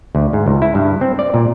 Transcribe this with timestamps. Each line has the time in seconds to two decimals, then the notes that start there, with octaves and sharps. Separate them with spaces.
0.15 D2
0.33 G#2
0.46 C#2
0.62 E4
0.75 G2
1.01 C4
1.19 D5
1.34 A#2